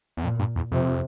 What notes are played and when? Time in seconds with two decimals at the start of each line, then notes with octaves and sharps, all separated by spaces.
0.17 E2
0.23 F2 A#2
0.39 G2
0.56 E2
0.72 F2 C3